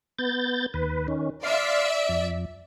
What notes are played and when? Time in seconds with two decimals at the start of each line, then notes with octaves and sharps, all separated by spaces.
0.19 B3 G6 A6
0.74 D#2 B4
1.08 D#3 C#4
1.43 D5 E5 F5 C6
2.09 F2